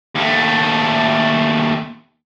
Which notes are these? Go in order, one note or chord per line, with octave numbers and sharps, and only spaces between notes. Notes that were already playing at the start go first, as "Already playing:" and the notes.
D#2 A3